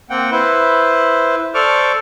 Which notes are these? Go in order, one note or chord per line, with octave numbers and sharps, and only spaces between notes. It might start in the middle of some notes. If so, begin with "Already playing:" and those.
A#3 C4 F#5 G5
E4 B4 C5
A4 C5 D5 C#6 D6 F6